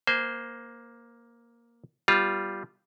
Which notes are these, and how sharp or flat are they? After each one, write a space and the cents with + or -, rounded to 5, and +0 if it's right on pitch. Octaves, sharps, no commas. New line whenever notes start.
A#3 +10 C5 -10 G#5 +35
G3 +0 B3 -10 F4 +0